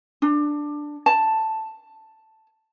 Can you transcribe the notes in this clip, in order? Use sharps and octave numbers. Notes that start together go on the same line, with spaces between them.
D4
A5